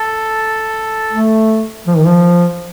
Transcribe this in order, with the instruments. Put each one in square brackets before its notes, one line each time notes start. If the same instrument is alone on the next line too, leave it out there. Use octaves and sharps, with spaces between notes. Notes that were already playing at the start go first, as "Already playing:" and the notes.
Already playing: [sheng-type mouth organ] A4
[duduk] A3
F3
D#3
F3